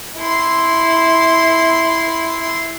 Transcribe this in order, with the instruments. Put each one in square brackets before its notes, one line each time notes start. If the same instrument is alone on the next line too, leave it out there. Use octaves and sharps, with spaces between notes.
[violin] E4 C6